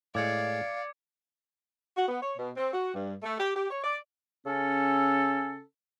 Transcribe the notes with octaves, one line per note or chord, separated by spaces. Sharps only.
A2 G#3 D5 F5 D6 G#6 C#7
F#4
B3
C#5
B2
C4
F#4
G2
A3
G4
G4
C#5
D5
C#3 C#4 A4